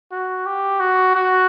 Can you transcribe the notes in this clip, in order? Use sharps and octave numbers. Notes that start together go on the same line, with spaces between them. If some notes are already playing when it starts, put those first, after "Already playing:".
F#4
G4
F#4
F#4